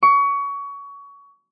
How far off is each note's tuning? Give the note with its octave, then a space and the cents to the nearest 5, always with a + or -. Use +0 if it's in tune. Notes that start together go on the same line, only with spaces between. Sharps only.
C#6 +25